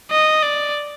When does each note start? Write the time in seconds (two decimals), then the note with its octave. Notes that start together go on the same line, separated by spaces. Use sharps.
0.11 D#5
0.43 D5